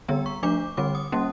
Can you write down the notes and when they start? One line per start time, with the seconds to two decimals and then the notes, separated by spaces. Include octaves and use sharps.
0.08 D3 G3 B3 A#5
0.26 C#6
0.43 F3 A3 D4 D6
0.77 D3 G3 C4 D6
0.95 D#6
1.12 G3 A#3 C#4